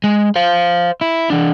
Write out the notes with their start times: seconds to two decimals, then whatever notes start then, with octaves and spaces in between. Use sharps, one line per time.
0.04 G#3
0.36 C5 F5
1.01 E4
1.30 E3 D4